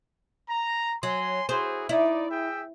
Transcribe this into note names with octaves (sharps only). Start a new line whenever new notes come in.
A#5
F#3 G#5 C6
E4 F#4 G#4 C5
D#4 E4 D5
G#4 E5 G5